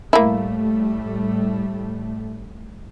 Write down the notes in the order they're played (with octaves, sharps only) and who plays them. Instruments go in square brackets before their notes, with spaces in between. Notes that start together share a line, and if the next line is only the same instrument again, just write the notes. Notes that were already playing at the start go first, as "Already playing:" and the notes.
[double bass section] A2 G3 A3 [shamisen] A#3 E4